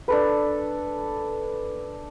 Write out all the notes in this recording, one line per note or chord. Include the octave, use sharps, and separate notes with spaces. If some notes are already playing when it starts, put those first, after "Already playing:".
D4 A4 B4